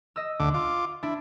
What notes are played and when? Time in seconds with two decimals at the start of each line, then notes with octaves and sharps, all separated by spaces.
0.16 D#5 E6
0.40 D2 D3 D6
0.54 F4 D6
1.03 D4 E4